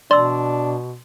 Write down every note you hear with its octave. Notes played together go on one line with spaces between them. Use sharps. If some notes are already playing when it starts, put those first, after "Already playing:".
B2 D4 D5 C6 E6